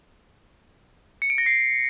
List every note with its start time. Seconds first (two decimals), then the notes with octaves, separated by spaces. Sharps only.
1.22 C#7
1.30 D7
1.38 A#6
1.46 C7